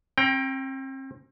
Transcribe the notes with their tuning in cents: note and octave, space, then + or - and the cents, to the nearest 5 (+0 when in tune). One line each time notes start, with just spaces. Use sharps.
C4 +40 G5 +0 A#5 +30